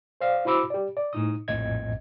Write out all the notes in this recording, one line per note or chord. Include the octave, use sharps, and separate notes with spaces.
C5 D5 F5 F6
E4 F#4 C5 B5 D6 E6
G4 D5
D5
A2 D#4 D#6
A#1 F2 A2 D#5 G#6